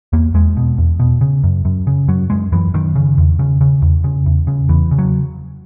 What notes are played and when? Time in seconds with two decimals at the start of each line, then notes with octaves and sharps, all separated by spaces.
0.13 E2 A#3
0.34 E2 G#3
0.57 B2
0.78 E2
1.00 B2
1.21 C#3
1.44 F#2
1.65 F#2
1.87 C#3
2.08 F#2 F#3
2.30 F#2 G#3
2.52 F#2 E3
2.74 F#2 D#3
2.95 C#3
3.18 E2
3.39 C#3
3.61 C#3
3.82 E2
4.04 C#3
4.26 E2
4.47 C#3
4.69 E2 E3
4.91 C#3
4.98 F#3